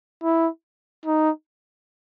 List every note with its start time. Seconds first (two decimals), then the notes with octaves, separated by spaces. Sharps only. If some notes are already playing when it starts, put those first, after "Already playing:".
0.23 E4
1.06 D#4